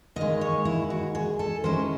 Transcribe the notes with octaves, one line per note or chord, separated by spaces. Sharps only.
D#2 D#3 G#3 D#5
C#5
E4
F#4
G#4
A4
D#3 G#3 C#4 E4 C5